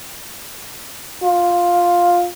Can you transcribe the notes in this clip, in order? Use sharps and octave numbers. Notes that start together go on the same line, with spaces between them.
F4